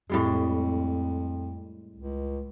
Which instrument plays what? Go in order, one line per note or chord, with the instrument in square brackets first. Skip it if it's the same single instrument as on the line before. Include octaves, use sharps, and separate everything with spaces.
[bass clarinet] F2 [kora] A2 G3 G#3
[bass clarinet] C#2